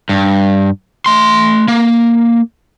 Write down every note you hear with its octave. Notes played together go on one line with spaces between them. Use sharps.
G2
A3 C6
A#3